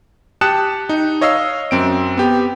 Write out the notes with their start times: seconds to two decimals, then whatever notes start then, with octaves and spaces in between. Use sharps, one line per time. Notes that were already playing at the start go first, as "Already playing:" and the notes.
0.41 G4 A5 D#6 F#6 C#7 E7
0.89 D#4
1.21 C#5 D#5 F5 E6 C7
1.71 F#2 C4 D7
2.17 B3 G4